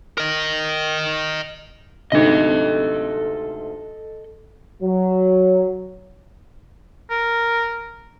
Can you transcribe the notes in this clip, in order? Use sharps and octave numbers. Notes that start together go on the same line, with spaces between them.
A#4 D#5
D2 G#2 C3 A4 D#5
F#3
A#4